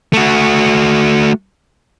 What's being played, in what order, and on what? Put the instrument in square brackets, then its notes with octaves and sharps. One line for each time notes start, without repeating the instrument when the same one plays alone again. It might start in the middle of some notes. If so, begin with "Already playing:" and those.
[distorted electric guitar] A3 F#4